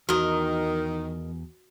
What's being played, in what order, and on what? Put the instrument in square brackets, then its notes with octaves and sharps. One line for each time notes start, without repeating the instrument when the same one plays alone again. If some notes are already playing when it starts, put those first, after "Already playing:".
[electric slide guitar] E2 [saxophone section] D#3 [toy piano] F#4 [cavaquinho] A#4 D#5